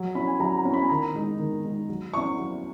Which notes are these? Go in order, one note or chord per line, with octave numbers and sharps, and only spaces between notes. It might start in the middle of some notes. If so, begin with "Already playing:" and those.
Already playing: F#3
C#4 E4 B5
G#5
F#3 A#5
A#5
C#4 E4
B5
G#5
D#3 A#5
G#3 D#4
D#3
G#3 D#4
F#3
C#4 E4 C#6
F#3